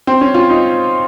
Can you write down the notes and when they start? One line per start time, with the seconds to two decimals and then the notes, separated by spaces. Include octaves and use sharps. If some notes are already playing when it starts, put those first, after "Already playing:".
0.07 C4
0.21 C#4
0.34 F4
0.50 D#4